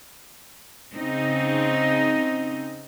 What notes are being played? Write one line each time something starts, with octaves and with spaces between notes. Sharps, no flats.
C#3 C4 D#4